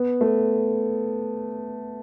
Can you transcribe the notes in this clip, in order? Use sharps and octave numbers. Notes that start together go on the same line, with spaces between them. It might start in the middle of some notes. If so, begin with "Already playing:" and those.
Already playing: B3
A3